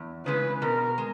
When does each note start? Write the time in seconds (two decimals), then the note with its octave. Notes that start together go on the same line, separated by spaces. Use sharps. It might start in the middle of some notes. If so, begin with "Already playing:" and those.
Already playing: E2
0.26 C#3 E3 G#3 B4
0.62 B2 A#4
0.98 G#3